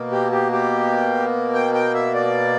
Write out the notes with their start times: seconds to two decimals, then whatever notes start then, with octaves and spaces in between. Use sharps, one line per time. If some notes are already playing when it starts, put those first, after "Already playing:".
Already playing: B2 A#3
0.12 G4
0.32 G4
0.52 G4
1.54 G5
1.74 G5
1.94 E5
2.15 D5